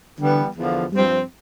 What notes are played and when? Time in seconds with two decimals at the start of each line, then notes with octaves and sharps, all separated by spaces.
0.19 D3 E3 G3 B3
0.56 E2 D3 F3
0.92 G2 F3 G3 C4